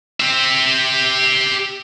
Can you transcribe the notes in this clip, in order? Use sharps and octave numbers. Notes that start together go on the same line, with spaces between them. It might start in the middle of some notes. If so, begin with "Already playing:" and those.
G4 E5